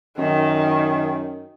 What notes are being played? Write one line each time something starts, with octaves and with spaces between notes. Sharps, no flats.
F#2 D#3